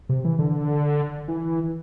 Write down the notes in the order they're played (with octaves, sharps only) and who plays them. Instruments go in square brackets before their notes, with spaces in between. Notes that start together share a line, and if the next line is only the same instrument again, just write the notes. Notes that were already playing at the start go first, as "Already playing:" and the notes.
[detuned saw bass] C3
E3
D3
E3